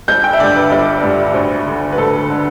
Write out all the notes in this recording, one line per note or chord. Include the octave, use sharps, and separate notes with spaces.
G1 G6
G5
E5
G2 D3 D5
B4
G1
G2 D3
D2
D3
B4
D2 A4
D3